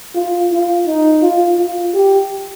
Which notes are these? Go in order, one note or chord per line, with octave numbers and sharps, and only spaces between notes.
F4
F4
D#4
F4
F4
G4